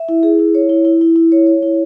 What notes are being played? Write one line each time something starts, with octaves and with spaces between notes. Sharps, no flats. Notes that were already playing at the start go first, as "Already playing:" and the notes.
Already playing: E5
E4
G#4
E4
C#5
E4
E4
E4
E4
C#5
C#5
E4